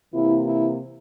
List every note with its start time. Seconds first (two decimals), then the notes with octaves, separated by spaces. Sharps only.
0.12 C3 E3 A#3 E4
0.45 E4